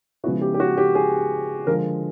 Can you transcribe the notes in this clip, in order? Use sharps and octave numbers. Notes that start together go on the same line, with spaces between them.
C#3 F3 G#3 B3 E4 F#4
G4
G4
F#4
G4
G#4
D3 F3 G#3 A#4